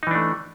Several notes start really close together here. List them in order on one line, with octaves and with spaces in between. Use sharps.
D#4 E3 D4 A3